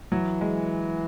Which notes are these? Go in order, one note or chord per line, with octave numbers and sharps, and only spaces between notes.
E3 F#3
G#3